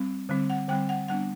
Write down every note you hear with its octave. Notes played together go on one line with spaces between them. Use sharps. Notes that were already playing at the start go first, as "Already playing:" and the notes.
Already playing: G3 C4
D3 G3 C4
F#5
D3 G3 C4 G5
F#5
G3 B3 D4 F#5